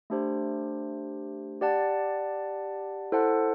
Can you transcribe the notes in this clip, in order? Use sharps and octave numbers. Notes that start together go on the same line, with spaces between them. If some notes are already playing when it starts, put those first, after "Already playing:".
A3 D4 G4 C5
G4 D5 F#5 A5
E4 A4 C5 F#5 A5